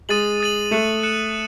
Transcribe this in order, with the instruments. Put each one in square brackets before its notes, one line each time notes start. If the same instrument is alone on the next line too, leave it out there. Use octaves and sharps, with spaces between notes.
[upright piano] G#3 [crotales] D#6 A6 D#7 F#7
[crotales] D#6 A6 D#7 F#7
[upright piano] A3 [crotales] F#6 C#7 E7
[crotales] F#6 C#7 E7